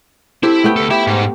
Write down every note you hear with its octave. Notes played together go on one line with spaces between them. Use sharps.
C4 E4 G4 A4
A3 B3 G5
D2 A4
G4 E5 B5
G#2